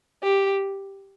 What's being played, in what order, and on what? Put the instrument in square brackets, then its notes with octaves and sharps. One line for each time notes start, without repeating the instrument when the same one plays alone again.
[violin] G4